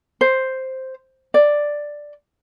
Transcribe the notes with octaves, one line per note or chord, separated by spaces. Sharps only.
C5
D5